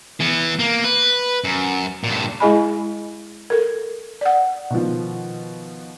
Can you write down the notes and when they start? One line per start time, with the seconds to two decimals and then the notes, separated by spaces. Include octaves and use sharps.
0.20 E3 B3
0.59 A#3
0.84 B4
1.44 F#2
2.04 G2 A#2
2.40 G#3 E4 G#4 D#5 G#5 B5
3.50 A4 A#4
4.21 D5 F#5
4.70 B2 D#3 F3